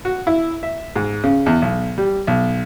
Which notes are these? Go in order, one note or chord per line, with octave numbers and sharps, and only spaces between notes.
F#4
E4
E5
G#2
C#3
E2
B1
G3
B1